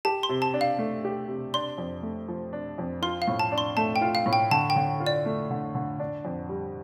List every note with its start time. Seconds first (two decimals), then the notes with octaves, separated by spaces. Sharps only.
0.05 G4 A5
0.23 C6
0.29 C3
0.42 A5
0.54 D4
0.61 F5
0.79 A3
1.05 G4
1.28 C3
1.54 D4 C6
1.78 F2
2.03 A3
2.28 F3
2.53 D4
2.78 F2
3.02 F4 C6
3.22 F5
3.28 A2
3.39 A5
3.52 D4
3.58 C6
3.77 A3 A5
3.96 G5
4.02 F4
4.15 F5
4.26 A2
4.33 G5
4.51 D3 A5
4.70 G5
4.76 D3
5.00 F4
5.06 D5
5.26 A3
5.51 D3
5.75 D3
6.00 D4
6.25 F2
6.49 G3